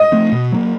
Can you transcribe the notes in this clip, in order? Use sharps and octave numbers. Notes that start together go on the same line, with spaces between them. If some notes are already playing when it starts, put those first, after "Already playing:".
Already playing: D#5
F3 A3 C4
B2
F#3 A#3